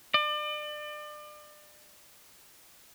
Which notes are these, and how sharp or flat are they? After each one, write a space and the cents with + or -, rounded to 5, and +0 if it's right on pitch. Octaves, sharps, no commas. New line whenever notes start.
D5 +35